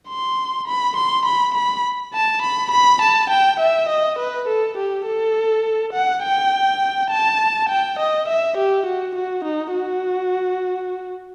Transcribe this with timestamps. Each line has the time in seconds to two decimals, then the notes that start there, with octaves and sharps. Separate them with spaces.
0.09 C6
0.68 B5
0.97 C6
1.26 B5
1.55 B5
2.14 A5
2.42 B5
2.72 B5
3.02 A5
3.30 G5
3.61 E5
3.89 D#5
4.19 B4
4.48 A4
4.77 G4
5.07 A4
5.94 F#5
6.24 G5
7.11 A5
7.69 G5
8.00 D#5
8.29 E5
8.58 G4
8.86 F#4
9.15 F#4
9.45 D#4
9.75 F#4